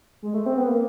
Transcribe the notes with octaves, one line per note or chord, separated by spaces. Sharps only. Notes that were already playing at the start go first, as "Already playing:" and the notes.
G#3
A3
C4
B3
A#3